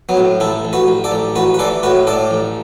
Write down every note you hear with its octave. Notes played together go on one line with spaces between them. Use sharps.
F#3 B3
A2
A1 E4 A4
A1
F#4 B4
A1
A4 D5
A1
A1 F#4 B4
B4
E3 A4 D5
A2 F#4 B4
A2 A4 D5
A1